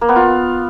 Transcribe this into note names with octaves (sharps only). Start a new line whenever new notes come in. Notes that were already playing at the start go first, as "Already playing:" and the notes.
A#3
B3
F4